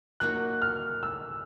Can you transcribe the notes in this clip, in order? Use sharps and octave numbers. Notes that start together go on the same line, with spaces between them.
F#3 A#3 D#4 F#4 F#6
F6
E6